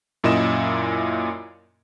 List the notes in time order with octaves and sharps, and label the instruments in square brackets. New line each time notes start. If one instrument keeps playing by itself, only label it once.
[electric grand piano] F#2 A#2 E4 D#5 E7